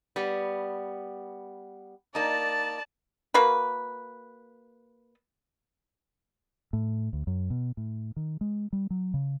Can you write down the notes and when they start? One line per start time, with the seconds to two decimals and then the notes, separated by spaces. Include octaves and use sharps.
0.16 G3 B3
2.15 A#3 D#4 D5 A5
3.34 A#3 F#4 B4
6.73 A2
7.13 D2
7.27 F#2
7.50 B2
7.77 A2
8.16 D#3
8.41 G#3
8.73 G3
8.90 F#3
9.14 C#3